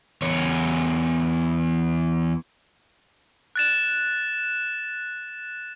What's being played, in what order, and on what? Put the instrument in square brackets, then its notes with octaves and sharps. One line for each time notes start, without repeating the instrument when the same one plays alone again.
[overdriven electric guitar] E2 C#5
[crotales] F#6 A6 E7